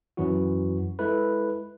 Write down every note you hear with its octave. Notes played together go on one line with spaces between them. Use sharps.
F#2 E3 F#3 E4 F#4
G#3 E4 A4 B4